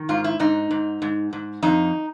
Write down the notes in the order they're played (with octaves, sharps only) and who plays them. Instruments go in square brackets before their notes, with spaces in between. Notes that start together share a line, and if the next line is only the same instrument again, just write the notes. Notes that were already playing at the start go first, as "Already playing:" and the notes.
Already playing: [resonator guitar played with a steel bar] D#3
G#2 F4
E4
G#2 D#4
G#2
G#2
G#2
F2 D#4